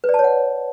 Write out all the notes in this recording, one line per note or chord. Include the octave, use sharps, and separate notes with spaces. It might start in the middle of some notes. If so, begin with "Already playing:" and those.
B4
D5
A5
C#5
F#5